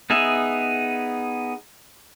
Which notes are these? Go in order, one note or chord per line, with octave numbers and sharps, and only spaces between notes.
B3 D#4 G#4 E5